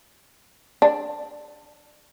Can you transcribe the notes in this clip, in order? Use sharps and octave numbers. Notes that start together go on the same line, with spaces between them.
D4